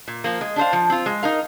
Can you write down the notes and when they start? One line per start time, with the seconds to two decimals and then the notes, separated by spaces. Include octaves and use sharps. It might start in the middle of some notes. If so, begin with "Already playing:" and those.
0.08 A#2
0.24 F3 A#3
0.41 G#3
0.56 D4 G#4 C5 F5
0.73 F3
0.90 C4 F4
1.06 G#3
1.23 D#4 A#4 F5